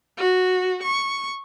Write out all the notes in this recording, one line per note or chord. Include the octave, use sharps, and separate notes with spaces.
F#4
C#6